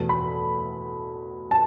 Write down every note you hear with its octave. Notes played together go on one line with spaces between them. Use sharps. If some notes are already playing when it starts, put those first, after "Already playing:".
Already playing: E2 B2 A3
B5
A5